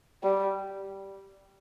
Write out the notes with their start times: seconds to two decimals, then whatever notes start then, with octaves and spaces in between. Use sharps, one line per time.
0.23 G3